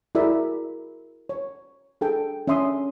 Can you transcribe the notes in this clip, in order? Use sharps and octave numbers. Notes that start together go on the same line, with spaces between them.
E4 F#4 G#4 A#4 D5 E5
C#5
D4 G#4 A4 G5
C#4 D4 E5 C6 D#6